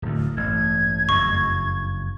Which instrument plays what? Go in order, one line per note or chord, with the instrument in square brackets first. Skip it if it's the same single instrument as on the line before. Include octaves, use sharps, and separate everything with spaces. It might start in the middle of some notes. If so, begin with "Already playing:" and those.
[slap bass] D1 D2
[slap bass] A1 G2 [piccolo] G#6
[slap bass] F#1 F2 [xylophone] C#6